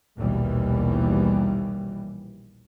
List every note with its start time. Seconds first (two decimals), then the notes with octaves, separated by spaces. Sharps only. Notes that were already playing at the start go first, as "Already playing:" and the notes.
0.17 A#1 D#2 B2 D#3 E3 G3